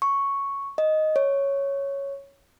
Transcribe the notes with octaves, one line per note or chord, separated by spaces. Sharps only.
C#6
D#5
C#5